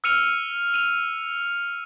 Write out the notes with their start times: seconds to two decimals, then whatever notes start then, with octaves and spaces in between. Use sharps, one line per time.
0.04 E6 F6 C#7 D#7 F7
0.74 D#7 F7